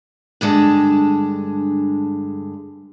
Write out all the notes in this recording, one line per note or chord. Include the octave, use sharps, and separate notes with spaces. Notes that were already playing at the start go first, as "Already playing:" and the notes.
G2 D3 G#3 A5